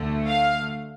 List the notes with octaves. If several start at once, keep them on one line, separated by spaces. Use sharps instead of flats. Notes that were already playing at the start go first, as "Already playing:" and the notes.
Already playing: D2 D3 A3
F5